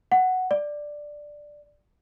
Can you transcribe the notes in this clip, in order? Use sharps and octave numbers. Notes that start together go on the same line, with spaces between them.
F#5
D5